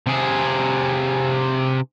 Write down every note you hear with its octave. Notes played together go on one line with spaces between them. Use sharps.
C3 G#4